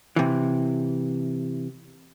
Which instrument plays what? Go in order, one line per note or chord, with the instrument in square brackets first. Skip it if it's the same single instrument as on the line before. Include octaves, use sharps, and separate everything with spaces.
[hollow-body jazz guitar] C3 E3